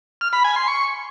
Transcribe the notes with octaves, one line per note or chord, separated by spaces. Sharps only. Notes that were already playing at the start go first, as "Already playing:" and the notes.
F6
B5
G#5
C6
C#6